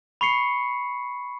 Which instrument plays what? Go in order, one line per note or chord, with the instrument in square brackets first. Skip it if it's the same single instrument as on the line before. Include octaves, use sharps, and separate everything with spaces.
[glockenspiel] B5 C#6 C7 C#7